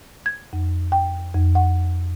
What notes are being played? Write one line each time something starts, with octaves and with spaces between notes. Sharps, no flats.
G#6
F2
G5
F2
F#5